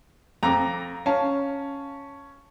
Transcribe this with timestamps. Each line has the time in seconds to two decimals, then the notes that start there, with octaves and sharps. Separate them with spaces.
0.43 F2 A#5 D6
1.06 C#4 F5 A5